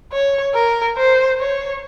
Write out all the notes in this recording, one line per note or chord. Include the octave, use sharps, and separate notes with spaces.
C#5
A#4
C5
C#5